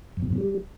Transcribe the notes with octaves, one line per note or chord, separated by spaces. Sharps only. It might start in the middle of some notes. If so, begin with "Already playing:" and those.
F#2
B2
F#2
B2
G3